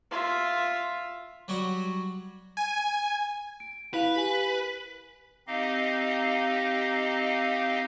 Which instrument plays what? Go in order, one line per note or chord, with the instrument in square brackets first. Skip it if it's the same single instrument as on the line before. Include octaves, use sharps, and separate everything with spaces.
[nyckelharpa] F4 E5
[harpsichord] F#3 G3 F#4
[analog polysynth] G#5
[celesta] D7
[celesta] E4 F5 F7 [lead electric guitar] B4
[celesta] G4 G#5 B6
[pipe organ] C4 D#4 G4 D#5 F5